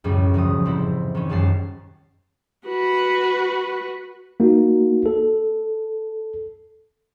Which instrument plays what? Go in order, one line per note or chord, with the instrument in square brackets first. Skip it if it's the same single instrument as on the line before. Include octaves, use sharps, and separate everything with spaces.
[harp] C#2 F#2 A2 G3 C#4
E1 A2 F3 D#6
F1 C4 E4
D#3 E3 C#4
A#1 F#2 G3 A5 C7
[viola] F#4 B4
[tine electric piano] A#3 D#4 F#4
A4